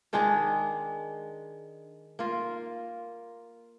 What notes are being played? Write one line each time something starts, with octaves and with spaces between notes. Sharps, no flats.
D#3 G#3 D4 G#4
A#3 F4 A#4